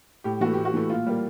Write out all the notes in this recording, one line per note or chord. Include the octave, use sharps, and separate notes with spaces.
A2 G4
E3 A3 F#4
A2 G4
F#4
E3 A3
A#2 F4
G3 A#3